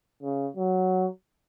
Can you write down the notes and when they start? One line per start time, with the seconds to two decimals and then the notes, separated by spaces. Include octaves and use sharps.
0.22 C#3
0.57 F#3